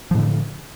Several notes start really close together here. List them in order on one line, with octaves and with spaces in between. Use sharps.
F3 A2 D3